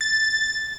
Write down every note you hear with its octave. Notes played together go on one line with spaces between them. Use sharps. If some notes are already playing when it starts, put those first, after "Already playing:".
A6